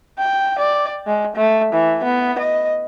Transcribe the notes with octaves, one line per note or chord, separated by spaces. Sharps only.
G5
D5
G#3
A3
E3
B3
D#5